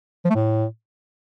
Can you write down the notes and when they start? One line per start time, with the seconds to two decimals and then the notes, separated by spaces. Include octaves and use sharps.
0.25 F3
0.30 A3
0.35 A2